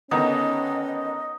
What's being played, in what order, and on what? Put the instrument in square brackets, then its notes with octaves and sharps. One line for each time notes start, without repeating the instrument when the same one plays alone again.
[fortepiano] D3 D#3 B3 [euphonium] C#4 [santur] D#4 [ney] D#5